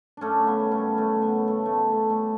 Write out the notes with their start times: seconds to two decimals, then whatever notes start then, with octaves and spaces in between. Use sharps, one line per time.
0.17 F#2 A3 C#4 D4
0.41 C#3
0.47 B3
0.59 G3
0.72 A3 C#4
0.78 F#2
0.97 F#2 A3
1.16 C#3
1.22 B3
1.36 G3
1.48 A3
1.53 F#2
1.66 A3
1.73 F#2 B3
1.91 C#3 A3
2.10 G3 A3